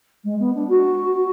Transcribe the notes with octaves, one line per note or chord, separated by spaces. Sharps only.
G#3
B3
D4
F#4